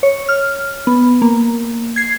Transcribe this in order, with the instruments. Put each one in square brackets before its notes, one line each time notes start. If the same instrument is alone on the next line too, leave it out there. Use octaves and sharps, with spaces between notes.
[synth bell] C#5
F6
B3
A#3
G#6 C7